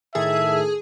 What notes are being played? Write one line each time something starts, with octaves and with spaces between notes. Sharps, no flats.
A2 D#3 G#4 A4 E5